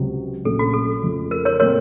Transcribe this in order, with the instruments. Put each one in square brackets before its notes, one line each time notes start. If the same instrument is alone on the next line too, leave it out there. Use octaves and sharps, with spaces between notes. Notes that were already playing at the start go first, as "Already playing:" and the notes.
Already playing: [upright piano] C#2 C3 F#3 C4
[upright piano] A#1 A#2 F#3 A3 C#4 [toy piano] A4
[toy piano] F#4
A4
[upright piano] F2 C#3 F3 A3
[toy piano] A#4
A#4 C#5
[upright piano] A#2 F#3 A3 C4 [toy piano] A#4 C#5